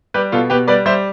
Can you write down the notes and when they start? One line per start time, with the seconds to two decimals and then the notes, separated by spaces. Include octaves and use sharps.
0.14 G3 G4 B4
0.32 B2 F4 A4
0.50 B2 G4 B4
0.68 G3 B4 D5
0.86 G3 C5 E5